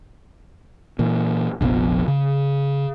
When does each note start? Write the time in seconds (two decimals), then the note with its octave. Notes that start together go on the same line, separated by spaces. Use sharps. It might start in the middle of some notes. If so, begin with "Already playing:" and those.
0.99 A#2 E3
1.61 F1 A#1 F3 B3
2.08 C#3